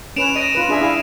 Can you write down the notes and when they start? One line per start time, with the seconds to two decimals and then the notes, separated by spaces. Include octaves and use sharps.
0.16 C#4 B4 D7 E7 F7
0.36 D#5 A#6 D7 D#7
0.55 F4 B4
0.69 D4 G#4 E5
0.80 E4 G#4 F5